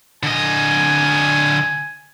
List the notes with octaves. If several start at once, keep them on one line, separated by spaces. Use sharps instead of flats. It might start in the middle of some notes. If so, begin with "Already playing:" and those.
D3 D#5 G#5